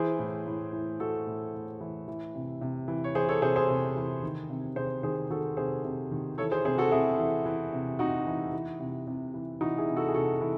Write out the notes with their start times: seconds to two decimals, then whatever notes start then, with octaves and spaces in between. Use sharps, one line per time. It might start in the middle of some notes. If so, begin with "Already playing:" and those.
Already playing: E3 G#4 C5
0.19 A2
0.47 A2
0.73 E3
1.00 E3 F#4 A4
1.27 A2
1.54 A2
1.81 E3
2.08 E3
2.35 C3
2.61 C3
2.88 E3
3.04 C#5
3.15 E3 G#4 C5
3.29 A4 C#5
3.42 C3 G#4 C5
3.56 G#4 C5
3.69 C3
3.96 E3
4.23 D#3
4.50 C3
4.76 C3 G#4 C5
5.03 D#3 G#4 C5
5.30 D#3 F#4 A4
5.57 C3 G#4 C5
5.84 C3
6.11 D#3
6.38 E3 A4 C#5
6.51 G#4 C5
6.65 C3 G#4 C5
6.78 F#4 A4
6.92 C3 E4 G#4
7.19 E3
7.46 E3
7.73 C3
7.99 C3 D#4 F#4
8.27 E3
8.53 E3
8.80 C3
9.07 C3
9.34 E3
9.61 E3 D#4 F#4
9.78 E4 G#4
9.88 C3
9.96 F#4 A4
10.08 G#4
10.14 C3 F#4 A4
10.41 E3